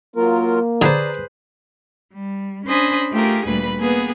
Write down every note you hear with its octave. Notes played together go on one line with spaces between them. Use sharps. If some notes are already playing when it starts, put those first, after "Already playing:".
F#3 A#3 F4 A#4
D3 G#4 B4 C5 D5 A#5
G3
C#4 D4 C5 D#5 G#5 B5
A3 F4 G4 G#4 A#4
D2 A#2 G3 B4 B5
A#3 B3 G#4 B4